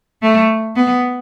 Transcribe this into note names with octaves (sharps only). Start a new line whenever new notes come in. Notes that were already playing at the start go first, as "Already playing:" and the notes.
A3
B3